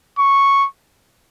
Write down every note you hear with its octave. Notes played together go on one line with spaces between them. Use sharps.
C#6